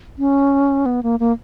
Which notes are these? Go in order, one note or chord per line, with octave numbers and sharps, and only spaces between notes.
C#4
B3
A#3
A#3